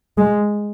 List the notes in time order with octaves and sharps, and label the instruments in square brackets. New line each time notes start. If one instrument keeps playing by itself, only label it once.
[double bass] G#3